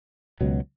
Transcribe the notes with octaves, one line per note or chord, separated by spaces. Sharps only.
C#2 B2 F#3